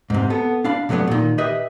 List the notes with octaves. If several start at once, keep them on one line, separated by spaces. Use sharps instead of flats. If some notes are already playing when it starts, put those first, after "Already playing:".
G#2 C3
B3 A4
D4 F5 B5
C3 F#3 A3 B3 D4
A#2 D#3
G4 B4 D#5 E5